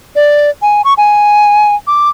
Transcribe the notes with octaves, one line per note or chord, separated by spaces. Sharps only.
D5
G#5
C#6
G#5
D6